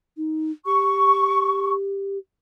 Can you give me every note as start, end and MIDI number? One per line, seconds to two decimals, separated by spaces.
0.17 0.51 63
0.66 2.18 67
0.66 1.72 85